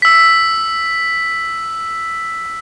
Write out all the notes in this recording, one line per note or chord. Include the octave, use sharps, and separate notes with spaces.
E6 B6